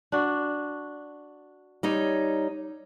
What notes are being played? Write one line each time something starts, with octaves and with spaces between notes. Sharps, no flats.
D4 F#4
G3 D#4 C#5